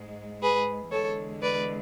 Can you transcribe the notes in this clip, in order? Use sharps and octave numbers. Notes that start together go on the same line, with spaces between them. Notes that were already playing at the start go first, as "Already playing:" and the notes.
Already playing: G#2 G#3
G#4 B4
E2 D3 G#3 A4 C#5
B4 D5